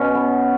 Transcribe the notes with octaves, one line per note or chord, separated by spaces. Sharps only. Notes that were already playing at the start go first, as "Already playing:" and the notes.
Already playing: B2 C#4
B3